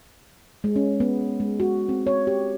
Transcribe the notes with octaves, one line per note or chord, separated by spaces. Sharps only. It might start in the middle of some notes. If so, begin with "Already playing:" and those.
G#3
C#4
B3
G#3
F#4
C4
C#5
G4